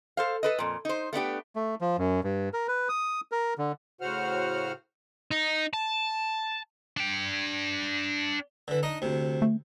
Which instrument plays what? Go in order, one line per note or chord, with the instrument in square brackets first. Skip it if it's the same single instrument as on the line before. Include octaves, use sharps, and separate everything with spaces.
[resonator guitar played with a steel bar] A4 C5 F5
A4 B4 D#5
F2 A#2
D#4 C5
A3 B3 D4 G4
[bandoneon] A3
F3
F#2
G2
A#4
B4
D#6
A#4
D3
[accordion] A2 C#3 F#4 C5 F#5 F6
[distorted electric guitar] D#4
A5
D4 G5
[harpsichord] D3 E3
D4 D#4 D#5
D2 C3
[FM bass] A3